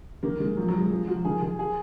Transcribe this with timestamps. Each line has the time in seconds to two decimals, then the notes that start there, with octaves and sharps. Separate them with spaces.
0.23 D#3 A#3
0.40 D#3 G#3
0.57 F3 F#3
0.68 F#3
0.74 F3
0.80 G#3
0.90 F3 G#3
1.07 F3 F#4
1.25 D#3 G#4
1.41 D#3 G#4
1.59 G#4